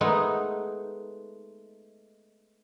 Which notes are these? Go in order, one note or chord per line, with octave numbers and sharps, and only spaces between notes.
G#3 A3 B3 D#4